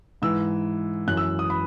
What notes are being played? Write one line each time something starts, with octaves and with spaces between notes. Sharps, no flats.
G#2 E3 E6
F#2 E3 F#6
E6
D#6
B5